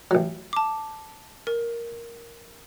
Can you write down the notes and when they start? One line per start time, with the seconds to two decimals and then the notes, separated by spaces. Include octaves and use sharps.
0.11 A1 F#3
0.53 A5 D6
1.47 A#4